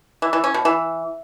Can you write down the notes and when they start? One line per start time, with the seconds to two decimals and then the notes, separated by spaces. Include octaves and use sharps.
0.22 E3
0.33 E3
0.44 C#4
0.54 B2
0.65 E3